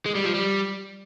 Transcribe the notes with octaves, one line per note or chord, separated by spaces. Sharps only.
G#3
G3
F3
G3